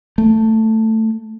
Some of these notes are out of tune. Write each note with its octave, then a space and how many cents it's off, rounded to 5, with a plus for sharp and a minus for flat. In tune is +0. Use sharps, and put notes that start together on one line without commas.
A3 +10